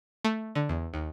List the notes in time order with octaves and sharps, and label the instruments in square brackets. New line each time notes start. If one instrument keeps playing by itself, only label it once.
[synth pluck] A3
D3
E2
D#2